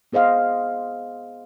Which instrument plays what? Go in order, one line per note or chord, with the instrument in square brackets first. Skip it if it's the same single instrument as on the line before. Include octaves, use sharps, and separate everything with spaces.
[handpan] B3 G#4 C5 D#5 F5